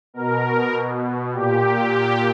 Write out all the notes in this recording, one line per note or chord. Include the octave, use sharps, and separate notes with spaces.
B2 A#4
B2
A#2 G4